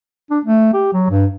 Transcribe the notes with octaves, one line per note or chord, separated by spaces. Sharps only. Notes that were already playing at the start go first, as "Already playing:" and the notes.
D4
A3
G4
F#3
G2